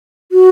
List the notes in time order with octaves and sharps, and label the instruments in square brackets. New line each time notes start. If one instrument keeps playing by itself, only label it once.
[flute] F#4